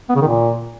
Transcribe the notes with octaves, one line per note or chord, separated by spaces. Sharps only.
B3
C#3
D#3
A#2